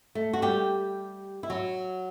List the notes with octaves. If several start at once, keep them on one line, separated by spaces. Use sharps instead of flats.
A3
F#4
G3 G4
E4
F#3 F#4